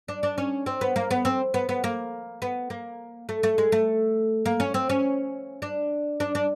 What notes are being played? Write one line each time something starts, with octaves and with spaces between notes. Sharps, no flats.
D4
D4
C#4
C4
B3
A#3
B3
C4
B3
B3
A#3
B3
A#3
A3
A3
G#3
A3
A#3
C#4
C4
C#4
D4
D4
D4